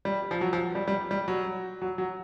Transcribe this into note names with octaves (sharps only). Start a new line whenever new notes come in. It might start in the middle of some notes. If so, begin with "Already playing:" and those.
G3
F3
F#3
F3
G3
G3
G3
F#3
F#3
F#3